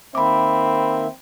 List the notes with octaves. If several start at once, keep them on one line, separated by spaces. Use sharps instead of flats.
D#3 A#3 C4 E5 B5 D6